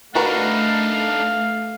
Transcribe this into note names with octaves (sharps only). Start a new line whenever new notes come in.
A3 D4 D#4 F#4 A#4 B4 F5